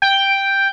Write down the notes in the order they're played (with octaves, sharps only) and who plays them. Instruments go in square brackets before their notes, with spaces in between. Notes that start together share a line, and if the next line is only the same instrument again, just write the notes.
[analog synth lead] G5